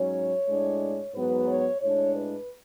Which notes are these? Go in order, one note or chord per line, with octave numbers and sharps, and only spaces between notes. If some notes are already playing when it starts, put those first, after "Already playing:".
Already playing: G#2 F#3 C#4 C#5
A2 G#3 D4
G#2 F#3 B3 B4
C#5
A2 G#3 D4 C#5
B4